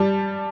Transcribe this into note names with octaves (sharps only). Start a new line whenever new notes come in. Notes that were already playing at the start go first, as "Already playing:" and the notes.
Already playing: G3 A5